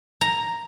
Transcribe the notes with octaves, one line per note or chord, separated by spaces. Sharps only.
A#5